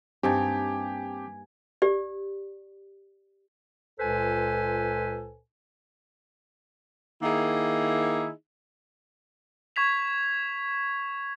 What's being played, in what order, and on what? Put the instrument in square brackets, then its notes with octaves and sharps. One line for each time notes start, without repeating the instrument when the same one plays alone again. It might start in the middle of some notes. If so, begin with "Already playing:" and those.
[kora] G2 A#3 D#4 [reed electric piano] C4 A5 [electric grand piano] G4 [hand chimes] G#5 G#6
[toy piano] G4 D5
[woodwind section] C#2 A#2 A4 B4 C5 G#5
[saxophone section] D#3 A#3 D#4 E4 G#4
[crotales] C#6 G#6 B6 F7